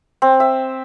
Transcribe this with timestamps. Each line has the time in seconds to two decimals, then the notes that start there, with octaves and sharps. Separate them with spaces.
0.22 C4
0.40 E5